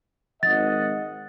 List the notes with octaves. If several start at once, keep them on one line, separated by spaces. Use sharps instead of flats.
G#1 D#5 F#5 A6